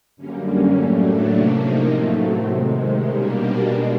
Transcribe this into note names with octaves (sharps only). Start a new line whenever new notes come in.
F#2 D3 G3 A#3 C#4
C#4
A2 F#3 A3 C#4
D4
C3 F3 A#3 C#4
D#4
A2 F#3 A3 C#4
C4
C3 D#3 G#3
B2 G3 A#3 C#4
D4
B2 G#3 D#4